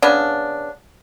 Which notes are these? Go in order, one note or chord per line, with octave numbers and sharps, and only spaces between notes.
C#3 B3 D4